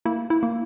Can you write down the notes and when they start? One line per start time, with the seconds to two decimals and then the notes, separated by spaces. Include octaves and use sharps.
0.05 A#3 E4
0.30 E4
0.43 A#3